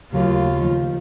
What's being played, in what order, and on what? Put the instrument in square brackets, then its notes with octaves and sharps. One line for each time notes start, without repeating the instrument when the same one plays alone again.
[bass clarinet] D#2 [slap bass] C#3 A3 [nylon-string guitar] F#3 A#3 [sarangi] F4
[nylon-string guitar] D#3 F3 A#3